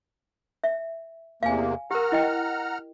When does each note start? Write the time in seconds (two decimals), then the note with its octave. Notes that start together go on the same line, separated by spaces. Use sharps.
0.64 E5
1.43 E2 C3 A#3 F5 G#5
1.91 G4 A#4 F#5 A#5 F6
2.12 E4 D#5 G5